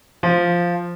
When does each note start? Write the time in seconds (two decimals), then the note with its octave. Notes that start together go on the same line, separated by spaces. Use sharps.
0.23 F3